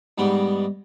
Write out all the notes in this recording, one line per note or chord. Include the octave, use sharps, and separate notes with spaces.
G#2 G3 B3 G5